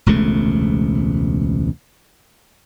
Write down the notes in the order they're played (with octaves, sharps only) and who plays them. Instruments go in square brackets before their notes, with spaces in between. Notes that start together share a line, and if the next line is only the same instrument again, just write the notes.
[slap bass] E1 C#2 C3 A3